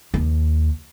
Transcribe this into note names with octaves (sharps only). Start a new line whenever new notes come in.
D#2